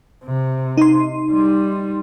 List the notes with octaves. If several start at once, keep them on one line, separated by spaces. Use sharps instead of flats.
C3
D#4 C6
G3